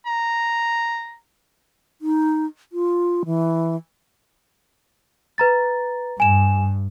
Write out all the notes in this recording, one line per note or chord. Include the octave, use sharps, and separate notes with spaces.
A#5
D#4
F4
E3
B4 A#5 A6
G2 G#5 E7